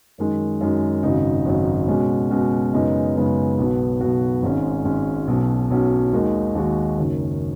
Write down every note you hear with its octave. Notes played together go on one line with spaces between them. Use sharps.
F#2 D#3 G#3
F#2 D#3 G#3
G#1 F#2 C#3 F#3 D#4
G#1 F#2 C#3 F#3 D#4
B2 G#3 C#4 F#4
B2 G#3 C#4 F#4
F#2 C#3 G#3 B3 D#4
F#2 C#3 G#3 B3 D#4
B1 B2 B3 F#4
B1 B2 B3 F#4
G#1 G#2 G#3 C#4
G#1 G#2 G#3 C#4
B1 B2 F#3 C#4
B1 B2 F#3 C#4
D#2 D#3 G#3 D#4 F#4
D#2 D#3 G#3 D#4 F#4
F#1 F#2 D#3